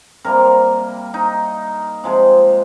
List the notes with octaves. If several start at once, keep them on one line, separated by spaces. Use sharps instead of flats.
C3 G3 A#3 A#4
D#4
C3 F3 G#3